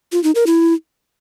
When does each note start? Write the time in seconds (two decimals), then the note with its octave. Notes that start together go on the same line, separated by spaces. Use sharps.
0.12 F4
0.24 D#4
0.35 A#4
0.47 E4